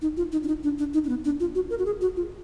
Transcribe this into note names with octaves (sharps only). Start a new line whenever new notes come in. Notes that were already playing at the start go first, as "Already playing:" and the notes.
D#4
F4
D#4
D4
D#4
D4
D4
D#4
D4
B3
D4
F4
F#4
A#4
F#4
G#4
F#4
F4